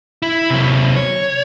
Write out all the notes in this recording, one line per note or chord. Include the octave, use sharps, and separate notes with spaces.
E4
C3 F#3
C#5